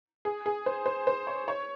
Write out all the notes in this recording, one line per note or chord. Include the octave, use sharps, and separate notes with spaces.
G#4
G#4
C5
C5
C5
C#5
C#5